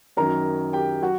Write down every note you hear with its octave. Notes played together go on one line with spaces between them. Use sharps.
F#2 D#3 F#3 A#4 A#5
G4 G5
F#3 F#4 F#5